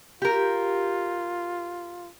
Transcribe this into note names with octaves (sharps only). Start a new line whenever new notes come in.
F4 G4 A#4